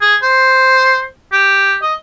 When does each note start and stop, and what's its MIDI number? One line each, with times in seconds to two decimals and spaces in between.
0.01 0.16 68
0.22 1.04 72
1.32 1.77 67
1.82 1.94 75